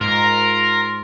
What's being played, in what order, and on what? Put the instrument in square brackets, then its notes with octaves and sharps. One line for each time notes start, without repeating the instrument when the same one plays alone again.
[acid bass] G#2 [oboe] F4 [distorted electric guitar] A#4